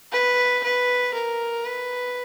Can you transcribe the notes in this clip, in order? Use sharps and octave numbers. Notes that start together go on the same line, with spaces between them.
B4
B4
A#4
B4